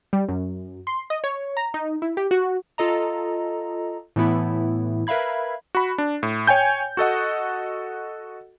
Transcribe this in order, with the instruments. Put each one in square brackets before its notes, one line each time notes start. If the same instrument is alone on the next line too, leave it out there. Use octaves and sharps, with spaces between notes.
[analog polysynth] G3
F#2
C6
D#5
C#5
A#5
D#4
E4
G4
F#4
[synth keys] F4 A4 D#5 A#5
A2 E3 A3 B3 E4
A#4 B4 E5 F5 B5 G#6
[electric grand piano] F#4 B5
D4
A2
C#5 G5 G#5 G6
F#4 A4 D#5 F#5